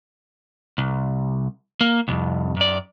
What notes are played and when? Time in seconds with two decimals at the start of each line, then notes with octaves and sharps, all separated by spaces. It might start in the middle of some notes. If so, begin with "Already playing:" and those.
0.78 C2
1.81 A#3
2.08 C2 F2
2.57 F#2 D5